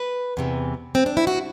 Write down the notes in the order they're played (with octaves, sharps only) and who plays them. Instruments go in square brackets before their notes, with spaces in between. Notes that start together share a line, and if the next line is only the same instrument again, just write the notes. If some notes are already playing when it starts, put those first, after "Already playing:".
Already playing: [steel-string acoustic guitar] B4
E2 C3 E3
C4
D4
E4
F#4